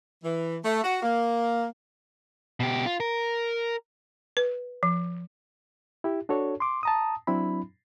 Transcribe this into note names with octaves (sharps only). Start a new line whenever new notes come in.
E3
A3
F#4
A#3
B2 G4
F4
A#4
B4
F3
E4 G4
D4 F#4 A4 C#5
C6 D6
A5 A#5 D#6
F#3 C4 D4 E4 B5